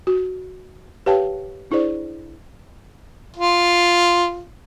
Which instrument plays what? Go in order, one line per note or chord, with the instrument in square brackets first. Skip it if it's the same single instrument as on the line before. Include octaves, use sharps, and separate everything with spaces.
[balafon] F#4
G4 B4 C#5 F5 G5 A5
D4 E4 G#4 C5 D5
[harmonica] F4